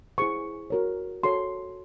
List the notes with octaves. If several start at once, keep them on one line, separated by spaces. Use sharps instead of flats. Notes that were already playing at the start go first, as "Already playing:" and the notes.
E4 G#4 C5 C#6
F#4 A#4 C#5
F#4 A4 C#5 C6